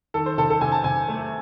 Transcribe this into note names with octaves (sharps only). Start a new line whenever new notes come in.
D#3 A4
C5
C3 A4
A4
C3 G#5
A5
C3 G#5
A3